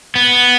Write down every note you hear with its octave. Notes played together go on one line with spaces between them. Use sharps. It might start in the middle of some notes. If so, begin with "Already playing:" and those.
B3